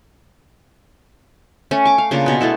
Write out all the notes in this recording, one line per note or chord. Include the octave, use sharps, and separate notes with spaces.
A3 C#4
C#6 D6
F5
C#3 A#3 D4 F4
B2 B3
G#3 A3 E4 A4